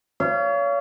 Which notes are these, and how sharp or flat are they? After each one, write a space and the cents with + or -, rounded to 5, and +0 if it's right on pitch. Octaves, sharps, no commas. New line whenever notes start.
C#5 +35 F5 -30